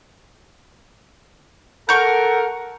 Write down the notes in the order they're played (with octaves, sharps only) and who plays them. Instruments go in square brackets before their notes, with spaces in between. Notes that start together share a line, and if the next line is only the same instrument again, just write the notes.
[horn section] A4 A#4 [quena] F#5 [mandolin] C#6 G6